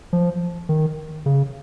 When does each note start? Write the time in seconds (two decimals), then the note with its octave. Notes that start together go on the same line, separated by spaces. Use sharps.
0.13 F3
0.69 D#3
1.26 C#3